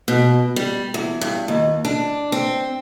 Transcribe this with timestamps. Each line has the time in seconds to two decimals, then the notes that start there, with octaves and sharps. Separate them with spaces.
0.08 B2
0.56 G3
0.94 E2
1.21 G2
1.48 D#2
1.85 D4
2.32 C4